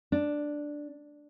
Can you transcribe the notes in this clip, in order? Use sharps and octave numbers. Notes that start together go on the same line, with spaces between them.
D4